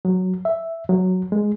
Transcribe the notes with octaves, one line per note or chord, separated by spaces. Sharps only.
F#3
E5
F#3
G#3